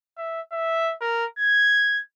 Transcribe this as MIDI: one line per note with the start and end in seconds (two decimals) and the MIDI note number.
0.18 0.41 76
0.52 0.94 76
1.01 1.25 70
1.39 2.01 92